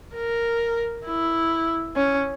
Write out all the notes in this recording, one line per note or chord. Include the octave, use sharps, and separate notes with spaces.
A#4
E4
C#4